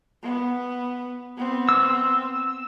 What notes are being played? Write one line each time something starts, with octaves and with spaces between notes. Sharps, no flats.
B3
B3 C4
E6